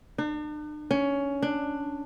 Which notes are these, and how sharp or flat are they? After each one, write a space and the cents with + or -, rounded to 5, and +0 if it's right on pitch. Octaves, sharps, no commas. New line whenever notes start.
D4 +45
C#4 +15
D4 +10